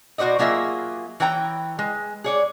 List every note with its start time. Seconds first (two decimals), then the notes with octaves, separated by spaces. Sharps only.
0.18 B2 F#4 C5 D5 D#5
0.39 F#3 A#3 F4 G#4 E5
1.20 E3 B4 C#5 G5 A#5
1.79 G#3
2.24 G#4 C#5 D5